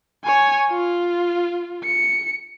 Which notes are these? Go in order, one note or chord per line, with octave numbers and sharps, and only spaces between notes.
C#5 G#5
F4
C#7